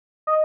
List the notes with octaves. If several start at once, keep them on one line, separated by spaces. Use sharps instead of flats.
D#5